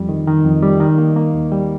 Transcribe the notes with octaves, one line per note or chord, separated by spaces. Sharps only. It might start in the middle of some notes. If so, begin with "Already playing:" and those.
Already playing: F2 G3
D#3
D#3
F2
G3
D#3
A#3
A#3
D#2
G3